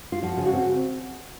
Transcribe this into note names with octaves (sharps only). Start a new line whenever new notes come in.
F4
F3 F#4
C#3
F#4
C4